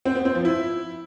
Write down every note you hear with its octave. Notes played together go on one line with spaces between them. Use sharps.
C4
B3
C4
F3
E4